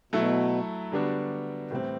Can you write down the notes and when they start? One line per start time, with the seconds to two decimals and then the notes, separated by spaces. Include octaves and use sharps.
0.12 B2 F#3 A3 E4 A4
0.92 D3 G3 B3 D4 F#4
1.71 A2 C3 E3 G3 C4